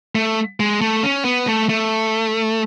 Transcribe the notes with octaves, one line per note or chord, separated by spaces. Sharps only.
A3
G#3
A3
C#4
B3
A3
A3